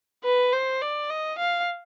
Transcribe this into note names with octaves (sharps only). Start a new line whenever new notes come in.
B4
C5
D5
D#5
F5